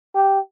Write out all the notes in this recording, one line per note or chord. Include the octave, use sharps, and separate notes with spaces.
G4